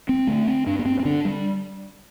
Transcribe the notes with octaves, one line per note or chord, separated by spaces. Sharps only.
C4
D3 A3
C4
G2 D4
B3
C4
C4
D3 D4
G3